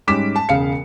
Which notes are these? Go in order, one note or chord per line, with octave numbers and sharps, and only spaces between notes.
G#2 G3 C#4 D6 B6 E7
A5
E1 C#3 F5 C#7